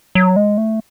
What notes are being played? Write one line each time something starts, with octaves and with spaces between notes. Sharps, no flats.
F#3
G#3
A3